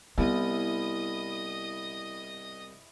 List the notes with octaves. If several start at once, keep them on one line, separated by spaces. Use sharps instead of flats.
C2 B3 E4 C5 D#5 D#6